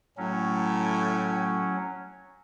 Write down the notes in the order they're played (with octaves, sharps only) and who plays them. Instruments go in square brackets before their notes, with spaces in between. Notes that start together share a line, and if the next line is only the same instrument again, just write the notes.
[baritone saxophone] A2 [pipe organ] F#3 C#4